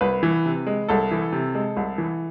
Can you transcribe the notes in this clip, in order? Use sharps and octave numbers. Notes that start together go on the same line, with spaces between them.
C2 B4
E3
C3
G#3
C2 A4
E3
C3
G#3
C2
E3